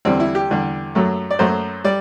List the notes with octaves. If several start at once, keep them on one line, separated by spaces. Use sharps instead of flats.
E2 D3 G3 C4
E4
G4
E2 D3 G3
F#2 F#3 A3
D5
F#2 F#3 A3 C5
G3 D5